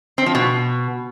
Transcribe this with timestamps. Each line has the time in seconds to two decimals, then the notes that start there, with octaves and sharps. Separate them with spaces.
0.18 C4
0.26 F3
0.35 B2